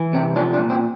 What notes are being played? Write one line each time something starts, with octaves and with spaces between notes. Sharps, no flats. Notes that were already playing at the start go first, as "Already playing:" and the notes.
Already playing: E3
C3 C4
F3 D4
D4
A#2
C4